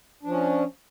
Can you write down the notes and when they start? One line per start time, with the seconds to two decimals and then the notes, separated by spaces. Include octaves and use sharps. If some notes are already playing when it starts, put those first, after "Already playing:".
0.23 D4
0.26 F3
0.29 C#4